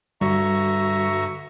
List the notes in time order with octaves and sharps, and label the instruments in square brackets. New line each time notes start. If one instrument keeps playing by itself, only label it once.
[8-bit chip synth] G2 D3 F#4 [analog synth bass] G3 [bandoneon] E5 A#5 C#6